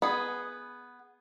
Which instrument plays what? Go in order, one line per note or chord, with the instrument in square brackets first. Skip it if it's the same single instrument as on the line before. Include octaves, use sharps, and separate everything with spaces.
[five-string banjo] B3 G#4